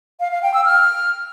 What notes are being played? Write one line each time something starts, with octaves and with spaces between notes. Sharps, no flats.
F5
F5
G5
E6
F6